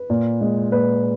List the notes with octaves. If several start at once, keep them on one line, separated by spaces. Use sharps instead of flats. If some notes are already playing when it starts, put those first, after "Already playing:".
Already playing: B4
A#2
G#3
A#2 B4